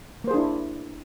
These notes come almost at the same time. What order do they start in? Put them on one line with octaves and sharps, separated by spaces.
A#3 C5 G#4 D4 E4